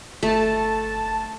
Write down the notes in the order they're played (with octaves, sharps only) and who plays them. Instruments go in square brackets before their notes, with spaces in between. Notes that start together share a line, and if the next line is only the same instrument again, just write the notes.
[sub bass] G1 [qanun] A3 [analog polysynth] A5